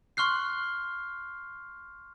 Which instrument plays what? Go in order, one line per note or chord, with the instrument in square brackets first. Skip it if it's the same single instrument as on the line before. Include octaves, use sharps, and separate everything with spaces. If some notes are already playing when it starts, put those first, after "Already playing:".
[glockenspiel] C6 C#6 F6 F#6 C7